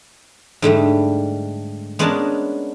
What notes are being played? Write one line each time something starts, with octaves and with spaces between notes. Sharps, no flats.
G#2 D3 G3 A3
G#3 B3 C#4 D4 A#4 A5